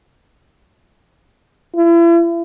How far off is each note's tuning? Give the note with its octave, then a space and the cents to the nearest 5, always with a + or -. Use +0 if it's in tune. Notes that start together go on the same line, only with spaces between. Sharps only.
E4 +40